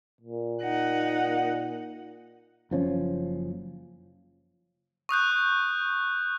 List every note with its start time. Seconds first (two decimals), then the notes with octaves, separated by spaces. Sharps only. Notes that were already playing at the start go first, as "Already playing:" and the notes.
0.21 A#2
0.62 D#4 F#5
2.71 F#1 F3 C#4
5.09 C#6 D#6 F#6 G6